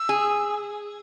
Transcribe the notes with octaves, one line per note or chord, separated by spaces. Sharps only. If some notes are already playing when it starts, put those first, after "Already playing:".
Already playing: E6
G#4